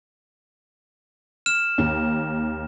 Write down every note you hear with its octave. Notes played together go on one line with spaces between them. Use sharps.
F6 E7
D#2